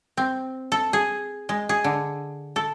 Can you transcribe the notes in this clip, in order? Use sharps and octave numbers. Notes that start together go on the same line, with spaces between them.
C4
A4
G#4
G#3
G#4
D3
A4